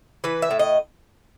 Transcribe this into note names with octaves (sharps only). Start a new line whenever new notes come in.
E3 B4
E5
A2
D#5